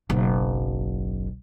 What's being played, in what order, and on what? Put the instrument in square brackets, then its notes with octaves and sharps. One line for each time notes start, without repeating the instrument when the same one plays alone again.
[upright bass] F#1 B1